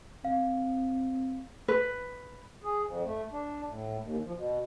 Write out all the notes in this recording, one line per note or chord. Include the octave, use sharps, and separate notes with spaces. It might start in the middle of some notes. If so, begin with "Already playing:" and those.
C4 F5
B4
G#4
F2
A3
D4
A2
D#2
F3
B2